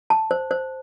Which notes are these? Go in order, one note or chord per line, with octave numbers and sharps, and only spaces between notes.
A5
C5
C5